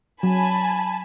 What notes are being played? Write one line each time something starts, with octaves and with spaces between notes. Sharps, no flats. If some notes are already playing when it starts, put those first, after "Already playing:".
F#3 G#5 A5 B5